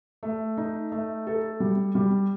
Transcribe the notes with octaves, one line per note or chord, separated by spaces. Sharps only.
A3
D#4
A3
A4
G3
G3